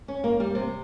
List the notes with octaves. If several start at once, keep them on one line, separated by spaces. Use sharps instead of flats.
C#4
A#3
G3
C3